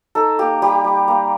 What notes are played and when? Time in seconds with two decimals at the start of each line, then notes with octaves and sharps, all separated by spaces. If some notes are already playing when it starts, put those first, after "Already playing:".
0.15 D#4 A4
0.39 A#3 G4
0.62 G3 G4
0.84 G3
1.08 A#3